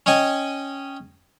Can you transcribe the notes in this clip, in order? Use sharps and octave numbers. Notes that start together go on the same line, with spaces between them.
C#4 C#5 D#5 G5 G#5